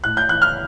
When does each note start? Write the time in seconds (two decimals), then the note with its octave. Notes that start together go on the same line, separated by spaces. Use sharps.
0.04 A2 F#6
0.17 G6
0.29 E3 F#6
0.42 F6